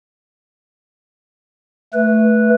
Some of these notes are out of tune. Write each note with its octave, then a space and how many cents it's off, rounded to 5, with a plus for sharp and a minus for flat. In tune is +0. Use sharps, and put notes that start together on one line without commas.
A3 +0 B4 -10